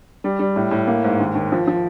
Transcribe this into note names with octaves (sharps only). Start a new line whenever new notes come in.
G3
G3
A2
A2
A#3
G#2
D#2
D#2
F3
F3